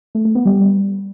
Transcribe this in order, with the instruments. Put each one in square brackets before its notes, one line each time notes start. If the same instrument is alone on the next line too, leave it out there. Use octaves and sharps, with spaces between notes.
[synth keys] A3
A3
B3
G3